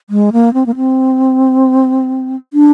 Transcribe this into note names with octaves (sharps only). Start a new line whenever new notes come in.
G#3
A#3
C4
A#3
C4
D4